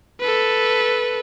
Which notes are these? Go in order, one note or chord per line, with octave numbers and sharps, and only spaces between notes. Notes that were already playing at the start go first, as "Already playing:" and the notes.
A4 B4